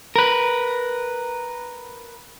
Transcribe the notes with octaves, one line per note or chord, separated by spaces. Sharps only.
A#4 B4